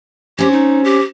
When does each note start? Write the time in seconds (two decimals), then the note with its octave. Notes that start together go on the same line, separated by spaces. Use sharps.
0.39 C4 C#4 G4
0.51 D#4
0.84 G4